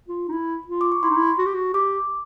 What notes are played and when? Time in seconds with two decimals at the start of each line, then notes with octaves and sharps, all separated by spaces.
0.08 F4
0.29 D#4
0.32 E4
0.67 F4
0.81 D6
0.92 C#6
1.03 E4 C6
1.10 D#4
1.17 E4
1.38 F#4
1.46 G4
1.54 F#4
1.74 G4 D6